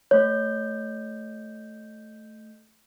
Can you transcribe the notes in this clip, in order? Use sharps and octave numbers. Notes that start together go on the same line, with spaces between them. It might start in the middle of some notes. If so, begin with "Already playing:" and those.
A3 C#5 G6